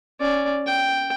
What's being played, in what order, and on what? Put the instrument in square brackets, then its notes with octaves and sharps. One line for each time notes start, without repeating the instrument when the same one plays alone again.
[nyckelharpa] C#4 D5
G5